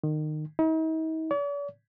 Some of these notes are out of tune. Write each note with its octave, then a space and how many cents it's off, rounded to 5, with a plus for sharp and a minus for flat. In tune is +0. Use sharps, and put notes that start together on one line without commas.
D#3 -25
D#4 +45
D5 -45